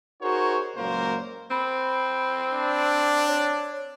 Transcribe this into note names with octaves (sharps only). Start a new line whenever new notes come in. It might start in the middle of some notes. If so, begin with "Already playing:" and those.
D#4 F#4 G#4 A#4 C5 C#5
C#2 A#2 F#3 A#3 A#4 C5
C4 B5
D4
C#5